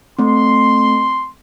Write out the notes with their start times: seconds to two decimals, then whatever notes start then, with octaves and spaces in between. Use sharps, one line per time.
0.19 A3 C4 C6